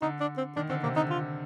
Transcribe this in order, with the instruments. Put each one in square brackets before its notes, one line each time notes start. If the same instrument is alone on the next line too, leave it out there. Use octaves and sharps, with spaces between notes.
[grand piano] D3 [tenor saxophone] D#4
[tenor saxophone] D4
C4
[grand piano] D#3 [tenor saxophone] D4
[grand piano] D3 [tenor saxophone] C4
[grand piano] C3 [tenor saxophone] A#3
[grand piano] D3 [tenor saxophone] D#4
[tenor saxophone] F4